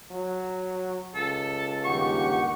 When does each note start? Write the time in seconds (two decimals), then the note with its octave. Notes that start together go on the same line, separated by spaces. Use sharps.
0.11 F#3
1.15 C#2 A4
1.85 G1 D#2 G4 F#5 C#6